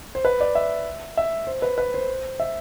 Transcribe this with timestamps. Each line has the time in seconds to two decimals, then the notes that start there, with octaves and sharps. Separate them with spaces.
0.15 C5
0.25 B4
0.40 D5
0.55 E5
1.17 E5
1.47 C5
1.62 B4
1.78 B4
1.94 C5
2.40 E5